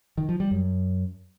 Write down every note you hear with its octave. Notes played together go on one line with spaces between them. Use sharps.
D#3
F3
G3
F#2